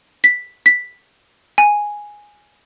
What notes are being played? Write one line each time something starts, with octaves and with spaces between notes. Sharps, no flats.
B6
B6
G#5